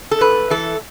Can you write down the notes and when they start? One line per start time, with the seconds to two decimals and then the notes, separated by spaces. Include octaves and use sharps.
0.11 A4
0.21 G#2 B4
0.50 E3 A4